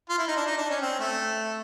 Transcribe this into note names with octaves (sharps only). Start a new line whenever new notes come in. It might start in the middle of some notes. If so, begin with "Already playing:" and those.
F4
E4
D#4
D4
D#4
D4
C#4
C4
A3